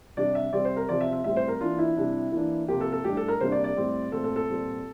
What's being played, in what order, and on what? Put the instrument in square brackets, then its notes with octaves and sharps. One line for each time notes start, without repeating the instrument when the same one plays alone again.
[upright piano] C3 G3 D4 D5
E5
C3 G3 C4 D5
C5
A#4
C3 F3 C4 D5
E5
E5
A2 G3 C4 E5
C5
A#4
E3 A#3 D4 F4
E4
C3 G3 D4
E3 A#3 D4
C3 F3 A#3 G4
A4
A4
A2 G3 D4 G4
A4
A#4
C3 G3 A#3 D4 C5
D5
D5
A2 G3 C4
A#2 A3 C4 A4
A4
A4
A#2 G3 C4